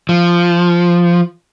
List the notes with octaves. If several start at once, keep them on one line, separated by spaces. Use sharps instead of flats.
F3